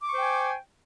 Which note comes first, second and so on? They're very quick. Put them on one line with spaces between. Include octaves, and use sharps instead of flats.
D6 C#6 C5 G5 G#5